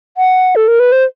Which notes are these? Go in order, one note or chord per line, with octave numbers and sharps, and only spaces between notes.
F#5
A4
A#4
B4
C5